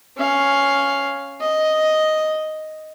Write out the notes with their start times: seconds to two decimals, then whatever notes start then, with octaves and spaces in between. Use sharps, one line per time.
0.17 C#4 F5
1.41 D#5